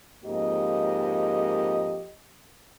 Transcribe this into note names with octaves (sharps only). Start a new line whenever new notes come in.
F2 G#2 A#3 G4 D#5